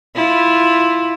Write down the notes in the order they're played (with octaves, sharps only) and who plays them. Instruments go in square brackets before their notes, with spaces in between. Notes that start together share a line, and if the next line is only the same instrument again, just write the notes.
[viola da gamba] E4 F4